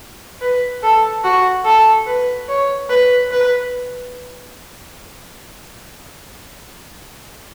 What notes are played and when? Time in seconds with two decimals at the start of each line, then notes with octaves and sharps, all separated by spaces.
0.41 B4
0.83 A4
1.24 F#4
1.65 A4
2.07 B4
2.48 C#5
2.89 B4
3.31 B4